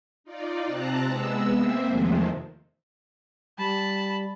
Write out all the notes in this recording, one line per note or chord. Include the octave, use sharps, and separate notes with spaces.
D#4 F4 D5
C3 C4 A5 A#5 F#6
G#3 B3 E6
A#3 C4 C5 E5
E2 C3 D#3 F3 G#3 A3
G3 A5 B5